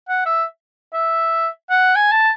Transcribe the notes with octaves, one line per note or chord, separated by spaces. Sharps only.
F#5
E5
E5
F#5
G#5
A5